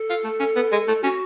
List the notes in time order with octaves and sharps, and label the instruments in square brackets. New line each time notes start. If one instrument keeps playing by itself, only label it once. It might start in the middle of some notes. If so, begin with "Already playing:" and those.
Already playing: [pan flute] A4
[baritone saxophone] F4
A3
C#4
B3
G#3
A3
[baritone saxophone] C#4 [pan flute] F#4